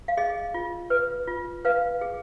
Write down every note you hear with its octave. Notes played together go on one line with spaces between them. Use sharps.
F5
G#4 D#5
F4
B4
F4
B4 F5
G#4